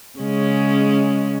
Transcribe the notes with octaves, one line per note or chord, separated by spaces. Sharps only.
C#3 G#3 C#4